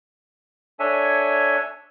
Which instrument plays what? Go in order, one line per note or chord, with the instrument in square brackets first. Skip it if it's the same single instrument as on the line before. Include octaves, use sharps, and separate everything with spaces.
[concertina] D4 A4 C#5 E5 G#5